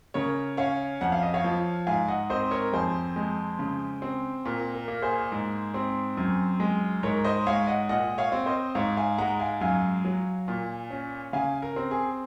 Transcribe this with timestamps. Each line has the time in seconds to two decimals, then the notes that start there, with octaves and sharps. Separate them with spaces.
0.14 C#3 A#4 C#5
0.57 C#4 C#5 F5
1.01 F2 F#5
1.12 F5
1.23 D#5
1.34 C#5 F5
1.44 F3
1.87 G#2 F5 G#5
2.08 D#5 F#5
2.30 C4 C5 D#5
2.51 A#4 C#5
2.73 F2 G#4 C5
3.16 G#3
3.59 C#3
4.02 C4
4.45 A#2 A#4
4.74 A#4
4.88 A#3
5.02 G#4 C5
5.32 G#2
5.74 C4
6.17 F#2
6.60 G#3
7.03 G#2 A#4 C#5
7.25 C5 D#5
7.46 G#3 C#5 F5
7.67 D#5 F#5
7.89 A#2 D#5 F#5
8.18 C#5 F5
8.32 C4
8.46 C5 D#5
8.75 G#2 C#5 F5
8.97 F5 G#5
9.18 G#3 F#5 A#5
9.39 F5 G#5
9.61 F#2 F5 G#5
10.05 F#3
10.48 A#2
10.91 C#4
11.33 C#3 F5 G#5
11.62 A#4
11.76 C4
11.91 G#4